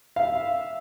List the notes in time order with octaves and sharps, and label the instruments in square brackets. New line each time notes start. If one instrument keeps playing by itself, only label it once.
[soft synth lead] E5 [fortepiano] F5